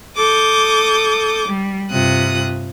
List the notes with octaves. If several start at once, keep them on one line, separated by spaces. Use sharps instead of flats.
A4 D6 D#6 G6
G3
G2 C3 F4 D#6 F#6